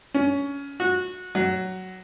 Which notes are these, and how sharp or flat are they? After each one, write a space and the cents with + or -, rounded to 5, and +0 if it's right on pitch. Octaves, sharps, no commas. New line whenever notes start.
C#4 +20
F#4 -20
F#3 +10